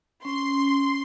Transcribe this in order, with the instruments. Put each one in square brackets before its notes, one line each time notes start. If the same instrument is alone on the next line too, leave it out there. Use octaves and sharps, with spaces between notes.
[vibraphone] C#4 [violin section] C6